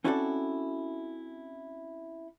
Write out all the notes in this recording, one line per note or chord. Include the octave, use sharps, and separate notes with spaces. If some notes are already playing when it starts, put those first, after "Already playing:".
C4 C#4 E4 F#4 A4 D5